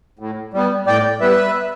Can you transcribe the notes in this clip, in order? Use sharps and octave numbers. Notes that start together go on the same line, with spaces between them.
A2
G3 B3
A2 D5 G5
G3 B3 B4 E5